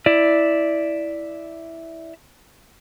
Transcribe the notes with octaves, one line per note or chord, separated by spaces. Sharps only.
E4 D5